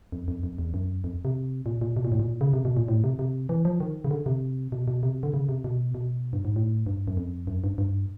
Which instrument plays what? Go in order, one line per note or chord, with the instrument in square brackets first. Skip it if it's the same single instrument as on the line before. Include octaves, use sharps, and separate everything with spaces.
[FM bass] F2
F2
F2
E2
F#2
F2
C3
A#2
A#2
B2
A#2
A2
A#2
C#3
C3
B2
A#2
A2
C3
C3
E3
F3
D#3
C#3
D3
C3
B2
B2
C3
D3
C#3
C3
B2
B2
G2
G#2
A2
G2
F#2
F2
F#2
G2
G2